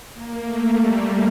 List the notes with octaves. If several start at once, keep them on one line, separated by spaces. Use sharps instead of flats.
A#3
A3
G3